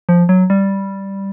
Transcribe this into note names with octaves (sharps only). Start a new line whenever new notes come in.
F3
F#3
G3